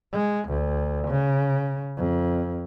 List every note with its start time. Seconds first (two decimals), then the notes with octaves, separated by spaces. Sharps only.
0.13 G#3
0.49 D2
1.09 C#3
1.97 F2